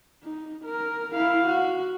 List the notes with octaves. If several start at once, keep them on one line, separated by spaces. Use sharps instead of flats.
D#4
A#4
E4 F5
F#4